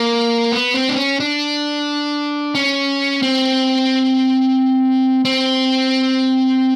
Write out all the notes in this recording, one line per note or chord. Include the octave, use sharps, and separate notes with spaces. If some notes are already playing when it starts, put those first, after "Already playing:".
Already playing: A#3
B3
C4
D4
C#4
D4
C#4
C4
C4